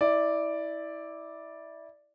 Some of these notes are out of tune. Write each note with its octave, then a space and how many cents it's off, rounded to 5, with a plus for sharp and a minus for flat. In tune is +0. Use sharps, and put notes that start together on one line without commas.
E4 -20 D5 +0